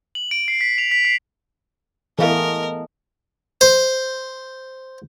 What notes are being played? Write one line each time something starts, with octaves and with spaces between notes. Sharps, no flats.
F#7
D7
C7
B6
F7
B6
C7
E3 G#3 A3 B3 G#4 A#4 F5
C5